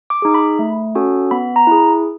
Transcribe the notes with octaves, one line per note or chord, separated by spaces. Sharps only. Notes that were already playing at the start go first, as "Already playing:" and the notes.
D6
D#4 G#4
B5
A3
C#4 F#4 A4
B3 B5
A#5
E4 G#4